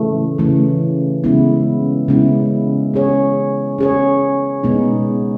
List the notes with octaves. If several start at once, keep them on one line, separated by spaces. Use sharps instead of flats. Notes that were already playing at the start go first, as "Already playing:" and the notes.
Already playing: C#3 E3 A3
C#3 E3 A3
C#3 G#3 B3 E4
C#3 G#3 B3 E4
C#4 G#4 C#5
C#4 G#4 C#5
B2 G#3 B3 D#4